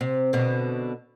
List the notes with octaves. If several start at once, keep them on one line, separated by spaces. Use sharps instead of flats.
C3
B2 D3